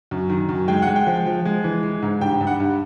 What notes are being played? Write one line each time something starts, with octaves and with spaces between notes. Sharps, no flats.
F#2
D#3
F#2
G#3 G5
F#5
G#3
G5
F3
F3
G#3
E3
G#3
G#2
G2 G5
G2
F#5
G2